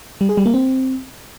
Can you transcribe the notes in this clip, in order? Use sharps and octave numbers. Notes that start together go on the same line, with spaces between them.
G3
G#4
G3
A#3
C4